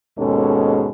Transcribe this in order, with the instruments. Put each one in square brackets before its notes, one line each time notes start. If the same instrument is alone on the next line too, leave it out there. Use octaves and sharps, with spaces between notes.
[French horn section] D#2 G#2 B2 G#3 C#4 A4